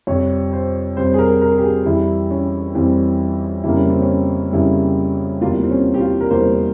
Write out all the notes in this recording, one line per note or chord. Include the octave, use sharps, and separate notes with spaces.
F2 C3 G3 C#5
C5
F2 C3 G3 C5
G#4
A#4
A#4
G4
G#4
F2 E3 G3 E4
C#4
F2 E3 G3 C4
F2 C#3 G3 A#3 E4
C#4
C4
C#4
F2 C#3 G3 A#3 E4
E2 C3 G3 A#3 F4
C4
C#4
G4
F4
A#4
E2 C3 G3 A#3 C5